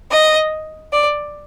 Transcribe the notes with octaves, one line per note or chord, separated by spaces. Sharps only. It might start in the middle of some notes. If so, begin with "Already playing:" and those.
D#5
D5